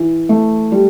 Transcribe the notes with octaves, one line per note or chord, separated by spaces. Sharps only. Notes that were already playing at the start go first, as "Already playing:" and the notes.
Already playing: E3
A3
G3